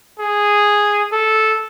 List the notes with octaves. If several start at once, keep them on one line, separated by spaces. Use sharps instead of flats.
G#4
A4